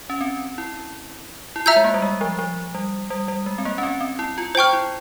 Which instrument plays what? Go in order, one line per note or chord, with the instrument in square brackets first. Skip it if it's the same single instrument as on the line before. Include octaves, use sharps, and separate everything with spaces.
[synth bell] C#4
C4
E4
E4
[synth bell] F4 [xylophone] E5 A#5 E6 G6
[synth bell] G#3
A#3
G3
G#3
F3
F3
G3
G3
G3
G#3
C4
A#3
C#4
C4
C4
E4
F4
[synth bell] F4 [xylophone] C5
[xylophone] G5 C#6 F6
[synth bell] E4